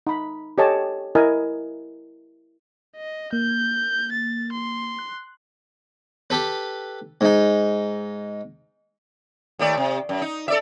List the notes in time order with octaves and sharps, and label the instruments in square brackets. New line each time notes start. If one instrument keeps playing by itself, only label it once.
[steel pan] D#4 B5
G4 A4 C#5 D#5 G#5 A5
E4 A#4 D#5 G#5
[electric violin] D#5
[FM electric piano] A#3 [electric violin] G6
[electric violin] A6
C6
[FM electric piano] F#6
[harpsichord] G4 A4 B4
G#2 D#4
[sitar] D#2 A3 D5
C3
F#2
D#4
A4 D5 E5